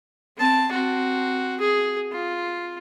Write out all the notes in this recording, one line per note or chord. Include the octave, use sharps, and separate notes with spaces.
C4 A5
C4 F#4
G#4
F4